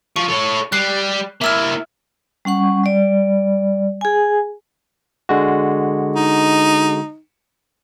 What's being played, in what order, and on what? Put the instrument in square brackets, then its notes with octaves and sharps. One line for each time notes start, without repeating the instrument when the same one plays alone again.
[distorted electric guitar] F3 [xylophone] C#6
[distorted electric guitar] A4 C#5
[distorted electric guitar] G3 [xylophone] F#6 C7
[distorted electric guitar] A#3 E4 [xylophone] E5 E6 F6
[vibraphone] G3 C#4 F#5 C#6
G3 D5
G#4 G#5
[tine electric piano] D3 G#3 F#4
[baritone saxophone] D#4